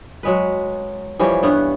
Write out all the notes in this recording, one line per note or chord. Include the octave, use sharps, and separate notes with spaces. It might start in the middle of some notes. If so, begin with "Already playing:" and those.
F#3 G#3 B4
E3 F3 G3 C#4
G2 B3 C#5 F#5